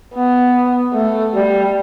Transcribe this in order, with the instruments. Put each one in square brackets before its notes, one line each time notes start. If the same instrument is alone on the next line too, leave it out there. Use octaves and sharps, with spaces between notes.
[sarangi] B3
A3
G3